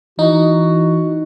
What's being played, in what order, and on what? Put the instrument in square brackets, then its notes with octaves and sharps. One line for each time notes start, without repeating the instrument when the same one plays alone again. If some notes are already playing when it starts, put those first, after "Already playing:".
[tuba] E3 [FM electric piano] D#4 [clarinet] F#4